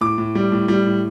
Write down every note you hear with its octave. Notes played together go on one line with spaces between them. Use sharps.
A2 D6
A2
G3
A2
G3
A2